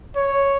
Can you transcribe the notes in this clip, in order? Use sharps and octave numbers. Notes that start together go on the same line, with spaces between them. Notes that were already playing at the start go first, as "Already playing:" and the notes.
C#5